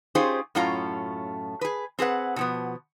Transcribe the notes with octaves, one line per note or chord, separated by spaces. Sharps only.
C#4 D#4 F4 G4 G#4 C5
F#2 A2 A3 C#4 F4 A#5
G#4 B4
C4 G#4 B4 F#5
B2 F3 B3